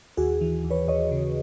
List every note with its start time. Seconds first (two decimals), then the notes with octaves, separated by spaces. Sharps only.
0.17 D#2 F#4 G#4
0.41 E3
0.64 D#2
0.70 B4 C#5
0.88 D#2 C#5 D#5
1.12 C#3